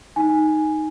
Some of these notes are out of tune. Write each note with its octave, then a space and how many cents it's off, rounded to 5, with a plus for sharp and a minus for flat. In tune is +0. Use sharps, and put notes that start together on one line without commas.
D#4 +0 G#5 +0